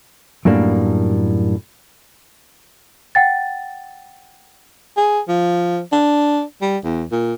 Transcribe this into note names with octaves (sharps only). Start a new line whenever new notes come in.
F#2 A2 G3 A#3 D4
F#5 G5 A6
G#4
F3
D4
G3
E2
A#2